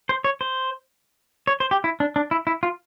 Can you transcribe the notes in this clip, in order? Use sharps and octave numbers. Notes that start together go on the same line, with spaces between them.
C5
C#5
C5
C#5
C5
G4
E4
D4
D4
E4
E4
F4